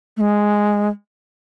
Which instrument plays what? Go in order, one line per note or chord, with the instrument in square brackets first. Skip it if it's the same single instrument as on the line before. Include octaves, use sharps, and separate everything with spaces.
[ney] A3
G#3